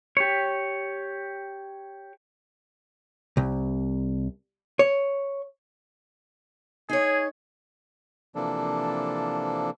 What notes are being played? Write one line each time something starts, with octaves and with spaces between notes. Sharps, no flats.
G4 C#5
C2
C#5
D#4 G#4 C#5
C3 E3 F3 A#3 D4 A4